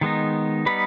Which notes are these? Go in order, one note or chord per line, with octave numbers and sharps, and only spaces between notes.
D#3 G#3 B3 D#4
G3 B3 D#4 B4 B5